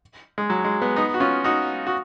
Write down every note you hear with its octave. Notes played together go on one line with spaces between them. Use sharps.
G#3
F#3
G#3
G#3 B3
B3 D#4
F#4
C#4 F4
D#4 F#4
F#4